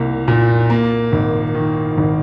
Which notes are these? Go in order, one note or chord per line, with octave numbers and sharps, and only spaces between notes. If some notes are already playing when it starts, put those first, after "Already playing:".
Already playing: C2 A#3
A#2
A#3
G#1
D#3
G#1